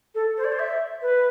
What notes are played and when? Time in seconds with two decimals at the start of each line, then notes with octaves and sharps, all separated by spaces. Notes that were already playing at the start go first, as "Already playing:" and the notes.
0.15 A4
0.37 C5
0.44 D5
0.52 C5
0.59 E5
1.02 B4